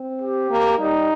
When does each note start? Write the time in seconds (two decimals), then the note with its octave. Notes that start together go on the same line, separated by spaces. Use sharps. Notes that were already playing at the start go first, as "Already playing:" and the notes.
Already playing: C4
0.22 G4
0.51 A#3
0.79 G3 D#4